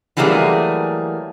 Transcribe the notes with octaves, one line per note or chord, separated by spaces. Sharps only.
E3 F#3 G3 A3 A#3 G#4